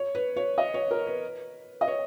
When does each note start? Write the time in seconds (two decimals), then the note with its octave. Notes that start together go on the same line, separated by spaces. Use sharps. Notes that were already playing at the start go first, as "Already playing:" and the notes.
Already playing: C#5
0.15 B4
0.36 C#5
0.58 D#5
0.74 C#5
0.91 A#4
1.07 B4
1.81 D#5
1.88 C#5